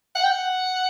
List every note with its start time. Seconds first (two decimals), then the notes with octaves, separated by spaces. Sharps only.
0.16 F#5
0.24 G5
0.32 F#5